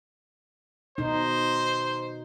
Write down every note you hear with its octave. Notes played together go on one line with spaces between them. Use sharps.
B2 D#4 C5